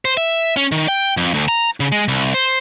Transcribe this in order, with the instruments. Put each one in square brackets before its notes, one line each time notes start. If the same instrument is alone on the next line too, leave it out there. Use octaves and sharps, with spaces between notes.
[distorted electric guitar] C5
E5
C#4
D#3
G5
F2
D2
A#5
C#3
G#3
C2
C5